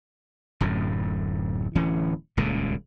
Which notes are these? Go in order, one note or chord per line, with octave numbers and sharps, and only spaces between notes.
D1 F#2 A2
D1 E3 C#4
D#1 C#2 A#2 C#3